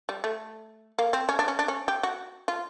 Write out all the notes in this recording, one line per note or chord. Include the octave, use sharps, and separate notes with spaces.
G3
A3
A#3
C4
C#4
D4
C#4
D4
C#4
G4
F#4
F4